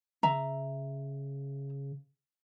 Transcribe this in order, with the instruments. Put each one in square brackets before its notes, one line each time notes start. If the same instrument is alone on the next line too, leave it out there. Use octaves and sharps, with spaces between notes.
[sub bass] C#3 [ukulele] E5 A#5